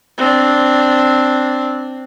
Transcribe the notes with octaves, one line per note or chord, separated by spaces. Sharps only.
C4 D4